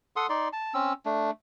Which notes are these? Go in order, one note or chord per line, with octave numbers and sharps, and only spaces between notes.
A4 F#5 C6 D#6
D#4 D5 C6
A5
C4 C#4 E6
A3 D4